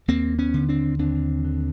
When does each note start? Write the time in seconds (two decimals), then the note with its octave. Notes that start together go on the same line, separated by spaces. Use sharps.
0.08 D#2 A#3 C4
0.39 B3 C#4
0.54 D3
0.69 C4 D4
0.99 D#2 C4 D4
1.44 D3